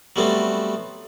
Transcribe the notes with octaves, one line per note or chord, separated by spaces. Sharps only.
F#3 G3 A3 B3 C4